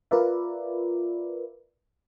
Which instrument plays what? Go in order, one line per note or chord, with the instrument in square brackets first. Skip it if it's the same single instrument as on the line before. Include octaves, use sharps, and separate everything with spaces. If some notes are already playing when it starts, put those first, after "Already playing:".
[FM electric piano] F4 A#4 B4 D5 E5